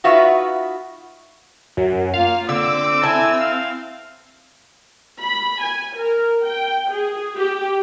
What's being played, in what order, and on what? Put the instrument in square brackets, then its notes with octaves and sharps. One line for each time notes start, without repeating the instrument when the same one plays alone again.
[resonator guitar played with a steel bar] D#4 F4 F#4 B4 E5
[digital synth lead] F#2
[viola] A#3 F4 [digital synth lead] F5
[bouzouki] D3 [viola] C4 [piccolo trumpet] D6 [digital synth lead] E6
[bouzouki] E4 A5 [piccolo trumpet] G#5
[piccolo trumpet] F5
[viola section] B5
G#5
A#4
G5
G#4
G4